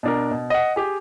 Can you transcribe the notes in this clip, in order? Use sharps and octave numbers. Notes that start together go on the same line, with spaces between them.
B2 D4 A#4
B2
D#5 F#5
G4 G#4